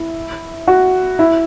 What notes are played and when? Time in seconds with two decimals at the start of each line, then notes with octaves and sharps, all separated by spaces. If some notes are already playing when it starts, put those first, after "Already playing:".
Already playing: E4
0.67 F#4
1.19 E4